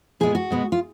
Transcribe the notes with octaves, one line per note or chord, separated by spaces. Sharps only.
A#2 G#3 B3 G#4
F#4
B2 G#3 B3
F4